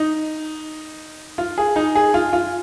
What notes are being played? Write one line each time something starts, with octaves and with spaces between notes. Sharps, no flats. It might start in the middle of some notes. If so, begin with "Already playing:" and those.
Already playing: D#4
F4
G#4
D#4
G#4
F4
F4